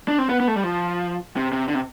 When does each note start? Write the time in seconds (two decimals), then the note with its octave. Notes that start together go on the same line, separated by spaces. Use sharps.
0.08 D4
0.19 C4
0.30 B3
0.40 B3
0.48 A3
0.56 G3
0.64 F3
1.37 C3
1.53 C3
1.68 D3
1.75 C3